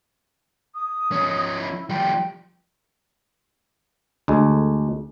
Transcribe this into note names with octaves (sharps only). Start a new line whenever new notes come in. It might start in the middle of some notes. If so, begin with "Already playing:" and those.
D#6
F3 C#4
E4
F3 G3 G5
D2 G#3